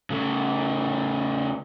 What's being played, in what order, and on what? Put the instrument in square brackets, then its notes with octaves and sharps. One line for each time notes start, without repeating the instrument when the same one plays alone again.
[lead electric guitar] C#3 A3